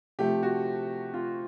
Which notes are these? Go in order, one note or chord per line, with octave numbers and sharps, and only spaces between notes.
C3 F3 A3 G4
F#4
F4